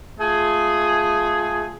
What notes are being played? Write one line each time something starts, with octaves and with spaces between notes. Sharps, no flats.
A3 F4 G#4